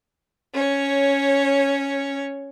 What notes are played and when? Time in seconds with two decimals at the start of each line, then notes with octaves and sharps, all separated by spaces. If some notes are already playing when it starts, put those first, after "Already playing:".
0.53 C#4 C#5